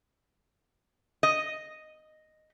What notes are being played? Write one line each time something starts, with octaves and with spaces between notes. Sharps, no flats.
D#5